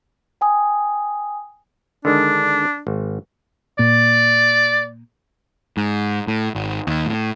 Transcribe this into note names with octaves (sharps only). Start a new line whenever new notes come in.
G5 G#5 D#6
D3 D#3 G#3 D4
G#1
A#2 D5
G#2
A2
G#1
D#2
A2